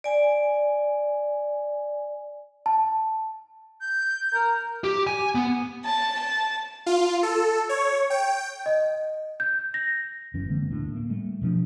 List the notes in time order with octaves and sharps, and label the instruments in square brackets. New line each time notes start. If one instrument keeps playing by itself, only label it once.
[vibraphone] D5 G#5
[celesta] A5
[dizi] G6
[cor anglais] A#4
[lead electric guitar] G4
G#5
B3
[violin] A5
A5
[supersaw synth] F4
A4
C#5
G5
[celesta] D#5
G6
A#6
[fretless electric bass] F#1 G2 E3 C#4
D3 G#3 A#3 C4
D1 A2 A3 D4
A#3
G3 A3
B2 F3 D4